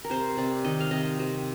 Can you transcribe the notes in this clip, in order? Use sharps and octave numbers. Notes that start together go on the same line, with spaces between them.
A#4
C3 C5
C3 D5
D#3 D#5
F5
C3 D#5
C3